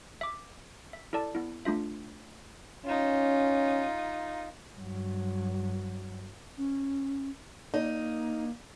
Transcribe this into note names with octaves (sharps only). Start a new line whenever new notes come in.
E5 D6
E5
E4 A4 D5 A5
B3 E4
A3 D4 F4 E5
C#4 D#4 F4
G2 F#3
C#4
A#3 D#4